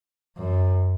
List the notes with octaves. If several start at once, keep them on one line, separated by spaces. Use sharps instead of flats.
F#2